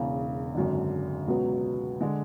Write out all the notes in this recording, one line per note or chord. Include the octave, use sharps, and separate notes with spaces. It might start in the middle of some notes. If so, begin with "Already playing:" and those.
Already playing: E1 E2 C#3
G#1 F#2 D3
C#2 B2 F#3 B3
D3 G#3